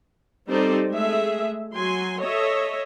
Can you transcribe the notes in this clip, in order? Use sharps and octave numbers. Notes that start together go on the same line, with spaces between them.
G3 C4 D#4 A4 C5 D5
G#3 A3 G#4 E5
F#3 G#5 C6
A4 C#5 D#5 E5